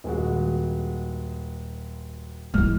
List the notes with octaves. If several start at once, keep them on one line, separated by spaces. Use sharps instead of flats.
D#1 G#3 F#4
G#3 E4 F6